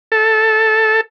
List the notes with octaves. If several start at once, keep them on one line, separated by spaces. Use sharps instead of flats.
A4